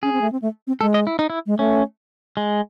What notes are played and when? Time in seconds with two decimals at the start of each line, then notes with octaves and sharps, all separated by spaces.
0.03 C#4 G#4
0.12 C4
0.21 A3
0.32 C4
0.42 A3
0.67 C4
0.81 G#3 A4
0.94 D#5
1.07 E4
1.19 D#4
1.30 E4
1.46 G#3
1.58 A3 C#4
2.37 G#3